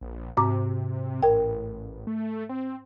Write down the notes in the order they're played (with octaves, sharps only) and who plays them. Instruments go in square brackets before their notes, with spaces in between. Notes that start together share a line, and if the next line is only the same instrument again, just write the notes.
[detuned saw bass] A#1
[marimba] G#2 A#5 D6 [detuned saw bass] C3
[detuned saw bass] A1 [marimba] A#4 G5
[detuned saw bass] A3
C4